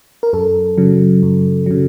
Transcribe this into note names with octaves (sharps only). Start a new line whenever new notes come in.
A#4
F#2 A4
C#3 F#3
F#2
C#3 F#3